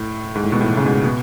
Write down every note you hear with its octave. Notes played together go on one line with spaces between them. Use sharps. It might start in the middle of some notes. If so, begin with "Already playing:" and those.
Already playing: A2
G#2
A2
G#2 B2
A2
B2
C#3
G#2 B2
B2